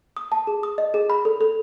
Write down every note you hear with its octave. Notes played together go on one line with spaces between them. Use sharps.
D#6
A5
G#4
D#6
D#5
G#4
B5
A4
A4